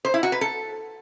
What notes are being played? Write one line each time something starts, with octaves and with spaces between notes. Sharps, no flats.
C5
E4
F#4
B4
A4